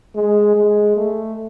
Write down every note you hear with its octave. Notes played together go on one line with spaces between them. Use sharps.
G#3
G#3
A3